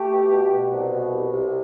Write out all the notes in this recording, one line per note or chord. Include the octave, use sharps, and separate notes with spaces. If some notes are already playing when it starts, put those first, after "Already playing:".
Already playing: A3 G4
B2
B2
B2
C2
B2
C2
C2